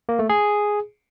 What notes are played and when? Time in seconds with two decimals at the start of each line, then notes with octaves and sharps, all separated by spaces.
0.09 A#3
0.19 A3
0.29 G#4